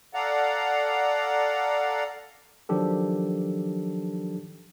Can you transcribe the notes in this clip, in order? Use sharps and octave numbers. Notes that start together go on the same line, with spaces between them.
A4 D5 F5 F#5 A#5
D#3 F3 F#3 D4 G4 A4